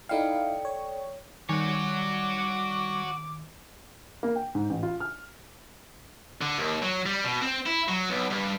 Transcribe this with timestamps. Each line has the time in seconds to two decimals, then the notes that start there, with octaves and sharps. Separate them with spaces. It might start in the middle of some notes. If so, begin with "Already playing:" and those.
0.09 D#4 E4 A4 D5 F5 G5
0.65 C#5
1.49 D#3 G3 F#4 C#5 G#5 D6
4.23 A#3
4.36 G5
4.55 G#2
4.69 A1
4.83 F4
5.00 F6
6.41 D3
6.59 D#2
6.83 F#3
7.06 G3
7.24 B2
7.42 C4
7.66 E4
7.88 F#3
8.10 B1
8.30 G2